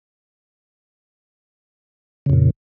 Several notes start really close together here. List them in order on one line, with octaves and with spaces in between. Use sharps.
C#3 F2 A#2